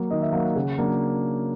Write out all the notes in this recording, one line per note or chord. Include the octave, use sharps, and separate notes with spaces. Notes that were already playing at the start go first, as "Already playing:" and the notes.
Already playing: F#3 A#3
D#3 D#5
E5
F#3 A#3 F5
F#5
C#3
F#3 A#3 D4